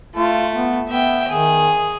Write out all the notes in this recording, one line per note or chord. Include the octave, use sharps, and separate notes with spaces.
A3 F4
B3
B3 E5 G5
D#3 G#4